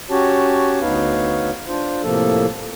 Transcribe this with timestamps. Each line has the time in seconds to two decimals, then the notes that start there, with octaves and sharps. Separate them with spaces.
0.10 C#4 F#4 G4 C#5 A5
0.81 D2 B3 D#4 B4 C#5 F5
1.68 D4 F4 C5
2.03 A2 C3 F3 A#3 A4